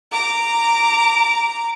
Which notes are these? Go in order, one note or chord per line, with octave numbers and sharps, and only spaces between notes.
A#5 D6